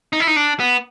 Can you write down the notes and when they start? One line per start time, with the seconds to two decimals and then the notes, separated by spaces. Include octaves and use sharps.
0.13 D#4
0.20 E4
0.27 D#4
0.36 D4
0.60 B3